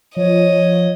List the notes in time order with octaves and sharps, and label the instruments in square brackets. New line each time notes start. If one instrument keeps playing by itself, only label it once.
[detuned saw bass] F3 [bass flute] C#5 [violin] D#5